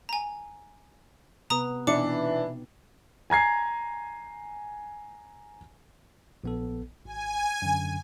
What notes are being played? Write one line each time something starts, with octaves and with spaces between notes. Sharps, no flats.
G#5 A#5
C3 B3 B4 A#5 D#6
B2 E3 C4 D4 D#4 D6 C#7
G#5 A#5 G#6 C7
A#1 B3 A4
G#1 G#5
F#2 D3